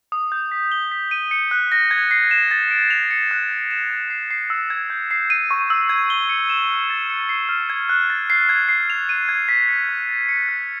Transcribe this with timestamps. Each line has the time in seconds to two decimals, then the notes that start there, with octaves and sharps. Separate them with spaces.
0.12 D#6
0.32 G6
0.52 B6
0.72 G7
0.92 B6
1.11 D#7
1.31 C#7
1.51 F#6
1.72 A#6
1.91 G#6
2.11 C7
2.31 E7
2.51 A6
2.71 D7
2.90 F7
3.11 C#7
3.31 F#6
3.51 A6
3.71 E7
3.90 G#6
4.10 C7
4.31 C7
4.50 E6
4.70 G#6
4.90 G6
5.11 C7
5.30 D#7
5.51 C#6
5.70 E6
5.89 G#6
6.10 G7
6.29 C#7
6.50 E7
6.70 F6
6.90 A6
7.10 C#7
7.29 C7
7.49 F6
7.70 G#6
7.89 F#6
8.10 A6
8.30 C7
8.49 G#6
8.69 C7
8.90 F7
9.09 D#7
9.29 G#6
9.49 B6
9.69 C#7
9.89 F#6
10.09 A6
10.29 C#7
10.49 F#6